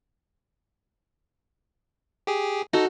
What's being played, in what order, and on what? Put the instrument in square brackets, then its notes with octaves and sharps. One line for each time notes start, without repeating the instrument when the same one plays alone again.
[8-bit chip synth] G4 G#4
[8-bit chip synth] D#4 A4 [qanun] F#4